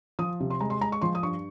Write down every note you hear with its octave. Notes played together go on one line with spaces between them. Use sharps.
F3 D#6
C3
C6
G#3 A#5
C6
G#3 A#5
C#6
F3 C6
D#6
G2 C#6